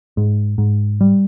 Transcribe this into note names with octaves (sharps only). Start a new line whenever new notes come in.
G#2
G#2
G3